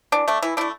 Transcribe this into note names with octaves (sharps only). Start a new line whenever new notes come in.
E3 D4
A3 D4
E3 E4
A3 D4 E4